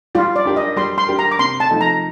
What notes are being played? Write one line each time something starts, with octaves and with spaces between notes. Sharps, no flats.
G3 F4
D5
D4 G4 A#4
D#5
G3 C6
C6
D4 G4 A#4
A#5
D6
C3 C6
A5
F3 A3 D#4
A#5